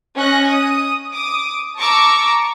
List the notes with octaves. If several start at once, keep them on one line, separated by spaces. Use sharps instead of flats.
C#4 D#5 F#6 A#6
D#6
D6 D#6
A5 A#5 C#6 D6 E6